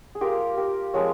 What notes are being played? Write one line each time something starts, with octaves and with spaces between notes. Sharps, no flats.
G#4
A#3 F4 G4 A#4
G4 A#4
F3 G#3 C4 A#4 C#5